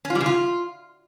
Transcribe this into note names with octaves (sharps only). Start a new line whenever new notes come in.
C#4
F4
G3
C#3
F4